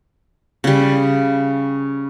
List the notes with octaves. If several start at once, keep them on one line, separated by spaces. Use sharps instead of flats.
C#3 G3